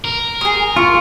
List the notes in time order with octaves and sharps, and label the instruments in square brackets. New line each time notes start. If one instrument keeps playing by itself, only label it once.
[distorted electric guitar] A#4
[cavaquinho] G#4 D#6
[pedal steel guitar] F4 [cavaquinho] C#6